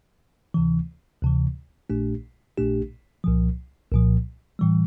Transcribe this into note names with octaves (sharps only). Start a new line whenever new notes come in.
D2 C3 E3
D2 C3 E3
A#1 A#2 A3 D4 G4
A#1 A#2 A3 D4 G4
C2 A#2 F3
C2 A#2 F3
A2 E3 G3